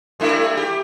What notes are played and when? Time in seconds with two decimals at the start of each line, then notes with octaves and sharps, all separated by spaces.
0.20 G2 A3 E4
0.57 G4